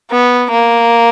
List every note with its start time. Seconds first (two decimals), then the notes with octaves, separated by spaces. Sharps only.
0.11 B3
0.51 A#3